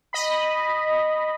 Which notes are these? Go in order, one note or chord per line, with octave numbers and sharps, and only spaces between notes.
D#5 B5